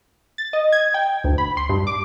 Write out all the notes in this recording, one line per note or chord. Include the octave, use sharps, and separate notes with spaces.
A6
D#5
G#6
G5
D2
B5
C6
G2
D6